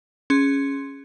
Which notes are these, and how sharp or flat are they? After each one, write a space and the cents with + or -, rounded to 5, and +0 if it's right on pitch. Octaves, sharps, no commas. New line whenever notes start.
C#4 +0 G#4 +0 C6 +0